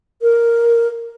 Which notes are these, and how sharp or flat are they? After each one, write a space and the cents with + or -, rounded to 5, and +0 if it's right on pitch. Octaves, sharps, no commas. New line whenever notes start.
A#4 +0